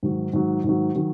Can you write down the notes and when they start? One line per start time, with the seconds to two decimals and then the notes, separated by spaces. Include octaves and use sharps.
0.03 G#2 D#3 F#3
0.33 G#2 D#3 F#3
0.64 G#2 D#3 F#3
0.95 D#3 F#3